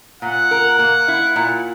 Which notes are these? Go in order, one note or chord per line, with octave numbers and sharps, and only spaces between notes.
A#2 F#5
A#4
A#3
E4
A#2